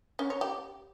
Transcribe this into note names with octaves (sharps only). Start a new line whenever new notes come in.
C#4
C#5
G4